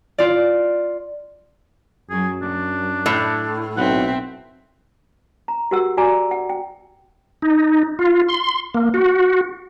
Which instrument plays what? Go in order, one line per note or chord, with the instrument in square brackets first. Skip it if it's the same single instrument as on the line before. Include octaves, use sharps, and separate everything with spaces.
[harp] F4 D5
[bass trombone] F#2 [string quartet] F#3 [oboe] G#4
[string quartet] F#3 [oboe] D4
[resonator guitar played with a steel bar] A2
[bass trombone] B1 [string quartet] C4 E5 [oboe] F#5
[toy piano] A#5
F#4 G4 A#4 F#5 E6
F#4 D5 G#5 A#5 D6
F#5
G5
[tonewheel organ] D#4
F4
C6
A#3
F#4